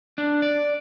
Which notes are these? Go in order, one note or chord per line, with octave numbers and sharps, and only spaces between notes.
D4
D5